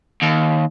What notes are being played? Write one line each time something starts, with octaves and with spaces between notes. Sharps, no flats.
D#2